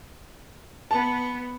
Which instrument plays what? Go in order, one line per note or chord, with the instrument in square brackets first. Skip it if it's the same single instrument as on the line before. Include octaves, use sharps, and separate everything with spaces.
[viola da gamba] B3 [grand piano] A5